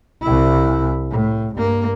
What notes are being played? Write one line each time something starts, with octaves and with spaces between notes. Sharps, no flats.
C2 E4
A2
G2 A#3